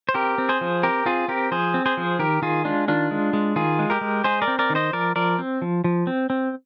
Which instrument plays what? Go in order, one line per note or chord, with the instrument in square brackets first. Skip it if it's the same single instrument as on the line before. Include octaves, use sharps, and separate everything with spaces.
[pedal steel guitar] C5
C4 G4 A#4
C4
G#4 C5
F3
C4 G4 A#4
C4 F4 G#4
C4 G4 A#4
F3 G#4 C5
C4
G#4 C5
F3
D#3 G4 A#4
D#3 F4 G#4
G#3 D4 F4
D#3 D4 F4
G#3
G#3
D#3 F4 G#4
G#3
G4 A#4
G#3
G#3 G#4 C5
A#4 D5
C4
A#4 D5
D#3
C5 D#5
F3 A#4 D5
F3 A#4 D5
C4
F3
F3
C4
C4